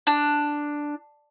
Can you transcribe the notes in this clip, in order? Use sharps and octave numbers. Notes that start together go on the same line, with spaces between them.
D4